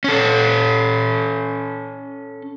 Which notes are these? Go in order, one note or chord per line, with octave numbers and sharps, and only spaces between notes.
C#4 A4